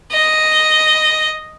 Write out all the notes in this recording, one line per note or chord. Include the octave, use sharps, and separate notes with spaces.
D#5